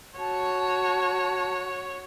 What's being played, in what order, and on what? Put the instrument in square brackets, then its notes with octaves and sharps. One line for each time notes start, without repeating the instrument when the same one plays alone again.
[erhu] F#4 [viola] C#5 [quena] A5